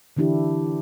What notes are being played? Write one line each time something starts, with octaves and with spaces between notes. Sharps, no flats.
D3 E3 D4 E4 G4